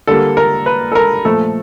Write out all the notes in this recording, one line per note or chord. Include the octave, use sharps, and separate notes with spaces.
D3 G3 A#3 A4
A#4
B4
A4
A#4
A#2 F3 A3 A4